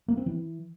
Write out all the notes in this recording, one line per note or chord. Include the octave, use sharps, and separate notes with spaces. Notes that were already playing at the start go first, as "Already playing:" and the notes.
A#3
C4
E3